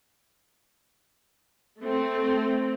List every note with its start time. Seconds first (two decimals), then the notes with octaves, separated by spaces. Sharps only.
1.80 A3 C4